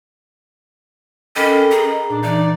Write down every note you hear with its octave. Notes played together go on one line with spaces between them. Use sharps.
C#4 A4 A#4 D#5 G5 B5 D6
G#4 A#4 A#5
A#2 D4
E3 D#4 D5